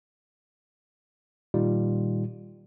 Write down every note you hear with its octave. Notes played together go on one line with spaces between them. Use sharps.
A#2 D#3 G3 D#4 F4